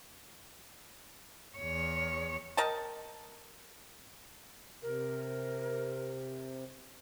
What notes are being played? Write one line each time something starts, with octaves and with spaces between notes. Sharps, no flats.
E2 C#5
A#4 D#5 G5 A5
C3 A#4